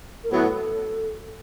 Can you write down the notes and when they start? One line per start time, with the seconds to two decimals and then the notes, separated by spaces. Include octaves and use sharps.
0.24 A#4
0.30 A2 F#3 B3 E4 A4